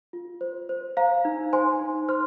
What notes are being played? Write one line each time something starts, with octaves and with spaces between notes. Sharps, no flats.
F4
C5
C5
C5 F5 A#5
D#4
C5 G#5 C6
D#4
C5 C6 F6